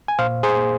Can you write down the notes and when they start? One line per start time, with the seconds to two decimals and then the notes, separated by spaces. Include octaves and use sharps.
0.08 G#5
0.19 A#2 C5 F5
0.43 G#4 C5
0.56 A#3